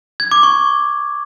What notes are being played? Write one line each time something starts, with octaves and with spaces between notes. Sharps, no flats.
G#6
D6
C#6